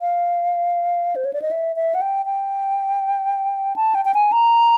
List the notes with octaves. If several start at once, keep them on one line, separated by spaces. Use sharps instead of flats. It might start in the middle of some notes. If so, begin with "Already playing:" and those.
F5
C5
C#5
D5
D#5
E5
E5
F#5
G5
G5
A5
G5
G5
G#5
A#5